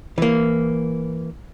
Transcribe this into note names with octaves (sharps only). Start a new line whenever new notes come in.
E3 A#3